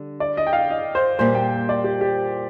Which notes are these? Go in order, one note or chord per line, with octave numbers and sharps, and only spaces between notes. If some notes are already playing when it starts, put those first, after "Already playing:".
Already playing: D3 G3
D5
D#5
G5
F5
D#5
C5
A#2 G3 A#3 C5
G5
D5
G4
G4